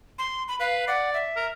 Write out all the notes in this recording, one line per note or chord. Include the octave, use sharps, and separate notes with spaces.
C6
B5
B4 F5
D5 F#5
E5
A#4